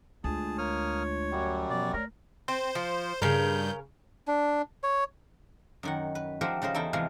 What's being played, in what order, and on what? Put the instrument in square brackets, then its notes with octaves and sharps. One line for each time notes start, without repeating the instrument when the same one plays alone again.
[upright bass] D2 [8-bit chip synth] G#3 D4 F4 [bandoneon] G#4 A5
[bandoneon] A#3 D#6 F6 [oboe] C#5
[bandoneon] F#2 F#3 G3
[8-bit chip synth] B2 F3 B3 [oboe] D5
[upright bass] A3 [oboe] A#4 [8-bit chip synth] C#5 D5
[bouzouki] C4 [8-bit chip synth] C5
[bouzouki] F3
[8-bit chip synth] G2 G6 [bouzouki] C#3 A#4
[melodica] D4
C#5
[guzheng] F#2 D#3 F#5
B4
F3 G4 A#4 C5 E5 F#5
C#3 D#4 A#4 C5
E2 D#4 E4 A4 G5
C3 E3 F3 G#3 F4